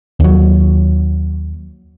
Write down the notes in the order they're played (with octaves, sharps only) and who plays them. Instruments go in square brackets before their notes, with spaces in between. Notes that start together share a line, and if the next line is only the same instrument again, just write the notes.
[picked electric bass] D#2 F#3